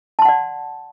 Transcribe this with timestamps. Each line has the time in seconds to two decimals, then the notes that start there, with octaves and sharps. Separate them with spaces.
0.19 A5
0.22 C6
0.25 F#5
0.29 D5